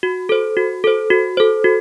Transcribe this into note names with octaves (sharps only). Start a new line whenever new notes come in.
F#4
A4 C5
F#4
A4 C5
F#4
A4 C5
F#4